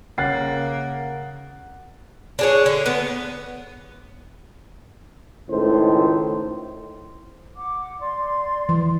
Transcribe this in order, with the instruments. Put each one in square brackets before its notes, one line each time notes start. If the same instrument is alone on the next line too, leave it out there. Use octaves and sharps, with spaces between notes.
[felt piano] C#3 [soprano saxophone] A#3 [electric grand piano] F#5 [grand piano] F#6 A6 C7
[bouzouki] D4 G#4 C#5
D3
B3
[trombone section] C#2 A2 D#3 C5
[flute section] F#5 D6
D5 C6
[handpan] E3